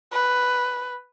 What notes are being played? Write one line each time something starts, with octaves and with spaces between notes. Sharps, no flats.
B4